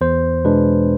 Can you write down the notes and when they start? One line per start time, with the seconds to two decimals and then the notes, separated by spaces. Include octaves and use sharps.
0.01 E2 C5
0.45 B2 G#3 D4 B4